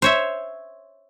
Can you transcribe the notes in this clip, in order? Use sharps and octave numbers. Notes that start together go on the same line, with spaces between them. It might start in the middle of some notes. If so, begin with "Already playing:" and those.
C5 C#5 E5